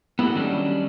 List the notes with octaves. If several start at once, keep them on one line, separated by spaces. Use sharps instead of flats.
B3 E4 F#4 G4 A4
D#3 F#3 G3 C#4 D4